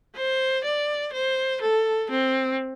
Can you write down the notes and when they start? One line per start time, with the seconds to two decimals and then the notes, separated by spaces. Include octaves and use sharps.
0.16 C5
0.64 D5
1.13 C5
1.61 A4
2.10 C4